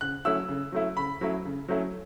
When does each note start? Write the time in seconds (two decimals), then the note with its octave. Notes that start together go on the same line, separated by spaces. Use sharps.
0.01 C#3 F#6
0.25 F#3 A3 C#4 E4 E6
0.48 C#3
0.72 F#3 A3 C#4 E4
0.97 C#3 B5
1.21 F#3 A3 C#4 E4
1.45 C#3
1.68 F#3 A3 C#4 E4